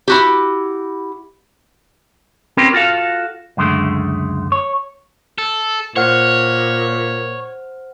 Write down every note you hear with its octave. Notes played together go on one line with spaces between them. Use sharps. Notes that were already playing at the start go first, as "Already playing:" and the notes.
E4 F#4 G4
C4 C#4 G4 A#4 B4
F4 F#4 A4 F5
C#2 F#2 D3 G#3 A3
C#5
A4
A#2 C5 C#5 F#5 F6